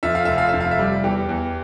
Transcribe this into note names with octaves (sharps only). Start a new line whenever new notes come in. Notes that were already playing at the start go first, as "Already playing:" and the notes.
F2 E5
F5
F1 E5
F5
E5
F2
F5
E5
G3
E2 G4
E2